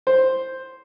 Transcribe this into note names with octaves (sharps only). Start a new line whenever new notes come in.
C5